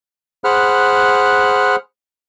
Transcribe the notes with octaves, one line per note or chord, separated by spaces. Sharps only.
G#4 C5 F#5 B5 F6 F#6